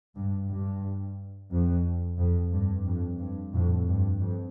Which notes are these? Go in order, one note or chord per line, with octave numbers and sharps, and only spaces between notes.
G2
G2
F2
F2
G2
F2
G2
F2 A2
G2
F2